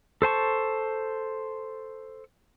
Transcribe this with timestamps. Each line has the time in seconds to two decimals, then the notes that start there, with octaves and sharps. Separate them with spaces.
0.22 A4 C5 A5 C#6